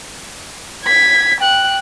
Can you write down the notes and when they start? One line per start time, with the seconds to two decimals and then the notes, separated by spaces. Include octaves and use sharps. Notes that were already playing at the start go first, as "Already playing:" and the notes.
0.85 G#6 B6
1.41 G5 F#6